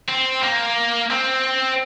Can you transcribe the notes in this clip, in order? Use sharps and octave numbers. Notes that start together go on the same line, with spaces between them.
C4
A#3
C4